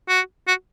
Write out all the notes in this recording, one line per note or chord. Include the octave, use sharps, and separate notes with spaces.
F#4
F#4